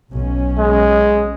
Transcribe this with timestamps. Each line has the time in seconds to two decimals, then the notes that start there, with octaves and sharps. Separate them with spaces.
0.14 B1 C#4
0.59 G#3